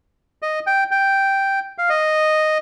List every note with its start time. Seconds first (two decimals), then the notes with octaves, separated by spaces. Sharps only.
0.42 D#5
0.67 G5
0.91 G5
1.78 F5
1.90 D#5